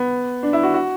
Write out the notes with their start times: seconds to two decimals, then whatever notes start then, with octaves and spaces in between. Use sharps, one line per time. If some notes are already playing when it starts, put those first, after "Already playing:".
Already playing: B3
0.43 D4
0.53 E4
0.63 F#4
0.74 F#4